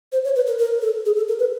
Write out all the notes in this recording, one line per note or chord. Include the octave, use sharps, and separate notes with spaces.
C5
C#5
B4
A#4
A#4
A4
G#4
A4
A#4
B4